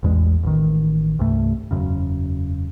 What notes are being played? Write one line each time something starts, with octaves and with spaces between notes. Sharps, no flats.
A1 E2 G#3
A1 D#3
C2 G2 A3
E1 A#1 F#2 C#3